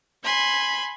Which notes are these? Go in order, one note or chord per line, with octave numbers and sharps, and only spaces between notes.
G#5 B5 C6